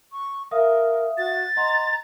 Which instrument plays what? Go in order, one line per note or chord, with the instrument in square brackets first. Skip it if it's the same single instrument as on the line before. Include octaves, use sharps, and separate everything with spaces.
[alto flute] C#6
[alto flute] A#4 [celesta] E5 F5 D#6
[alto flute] F#4 [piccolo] A6
[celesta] D#5 F#5 C6 [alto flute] A#5